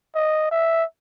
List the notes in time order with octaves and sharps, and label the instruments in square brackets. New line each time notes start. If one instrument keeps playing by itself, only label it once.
[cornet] D#5
E5